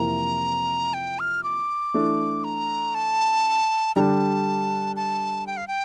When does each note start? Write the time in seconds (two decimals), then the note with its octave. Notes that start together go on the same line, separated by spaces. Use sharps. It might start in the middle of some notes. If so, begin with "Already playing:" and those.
Already playing: F2 C3 E3 A#3 A#5
0.94 G5
1.19 F6
1.43 D6
1.94 E3 A3 D4
2.44 A#5
2.95 A5
3.96 D3 G3 D4 A5 A#5
4.96 A5
5.47 G5
5.57 F5
5.68 G5